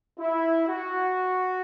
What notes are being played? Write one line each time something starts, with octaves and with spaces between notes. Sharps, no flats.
E4
F#4